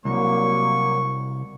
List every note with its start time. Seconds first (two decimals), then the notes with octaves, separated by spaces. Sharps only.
0.05 C2 F#3 A#3 C#6